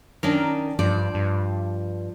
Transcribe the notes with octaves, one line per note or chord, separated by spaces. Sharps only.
D#3 C#4 D4 A#4
G2 F3 D5
G2